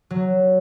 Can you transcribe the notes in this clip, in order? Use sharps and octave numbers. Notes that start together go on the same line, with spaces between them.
F#3